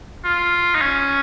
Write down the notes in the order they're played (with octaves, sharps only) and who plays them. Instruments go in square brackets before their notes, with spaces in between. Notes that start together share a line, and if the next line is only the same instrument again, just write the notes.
[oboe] F4
D#4
C#4